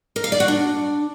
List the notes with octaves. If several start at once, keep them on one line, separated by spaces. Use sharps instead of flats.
A#4
F5
D5
F#4
D4